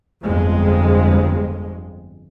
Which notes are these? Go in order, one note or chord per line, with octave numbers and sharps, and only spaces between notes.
G1 F2 G#3